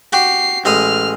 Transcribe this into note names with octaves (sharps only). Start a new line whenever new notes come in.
F#4 G4 C7
A1 G#3 D#6 F6